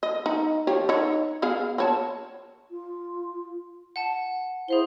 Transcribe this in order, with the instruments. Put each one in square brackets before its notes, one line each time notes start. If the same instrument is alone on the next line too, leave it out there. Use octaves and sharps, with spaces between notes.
[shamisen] D#5
D#4
F3 G4 C#5
D#4 C#5
B3 G#4 F5
C4 C#5 A5
[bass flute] F4
[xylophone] F#5 A5
[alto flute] E4 [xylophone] G#4 F5 G7 [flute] C5